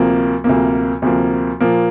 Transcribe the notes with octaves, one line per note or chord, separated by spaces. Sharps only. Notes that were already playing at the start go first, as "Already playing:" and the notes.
Already playing: D2 C3 F3 A#3
D2 C3 F3 A#3
D2 C3 F3 A#3
A#2 F3 A#3